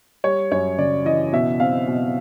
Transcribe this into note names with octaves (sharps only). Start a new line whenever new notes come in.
G3 C#5
F#2 C#5
C#3 D5
E3 D#5
B2 E5
C4 F5
B2